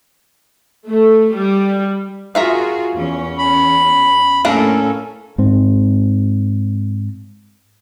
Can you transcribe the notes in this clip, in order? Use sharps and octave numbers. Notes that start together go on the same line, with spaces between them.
A3
G3
F4 F#4 G#4 A#4 E5 F5
E2 C#4
B5
A2 A#3 C#4 D4 A4 A#4
G#2 C4